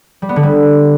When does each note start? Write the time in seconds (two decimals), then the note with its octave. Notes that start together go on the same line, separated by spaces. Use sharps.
0.22 G3
0.29 B3
0.36 D3
0.43 G3